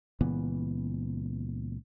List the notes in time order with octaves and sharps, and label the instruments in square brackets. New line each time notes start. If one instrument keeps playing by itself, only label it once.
[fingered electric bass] C#2 A#2 E3 B3